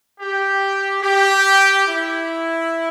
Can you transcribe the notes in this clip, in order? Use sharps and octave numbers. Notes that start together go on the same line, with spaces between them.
G4
G4
E4